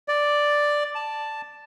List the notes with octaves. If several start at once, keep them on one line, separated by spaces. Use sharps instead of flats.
D5
A5